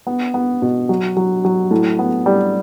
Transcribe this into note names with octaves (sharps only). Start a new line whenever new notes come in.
B3
B3
B2
F#3
F#3
F#3
A2
B3
G3